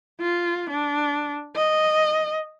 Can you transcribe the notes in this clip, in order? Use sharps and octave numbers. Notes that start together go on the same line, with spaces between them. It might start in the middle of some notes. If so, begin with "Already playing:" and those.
F4
D4
D#5